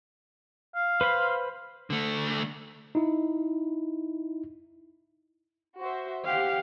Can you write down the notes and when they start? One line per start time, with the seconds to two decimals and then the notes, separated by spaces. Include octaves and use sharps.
0.75 F5
1.01 B4 C5 B5
1.90 D3 A3
2.95 D#4 E4
5.80 F#4 C5 E5
6.25 G4 F5 F#5